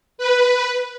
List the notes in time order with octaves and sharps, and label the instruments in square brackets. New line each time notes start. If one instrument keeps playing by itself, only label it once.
[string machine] B4